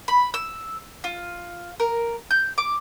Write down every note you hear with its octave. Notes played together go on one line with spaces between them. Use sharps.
B5
E6
F4
A#4
G6
D6